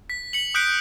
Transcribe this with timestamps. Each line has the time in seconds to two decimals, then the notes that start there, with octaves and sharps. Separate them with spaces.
0.10 B6
0.33 B6 C#7 F#7
0.54 D#6 F#6 G6 B6 C#7 D7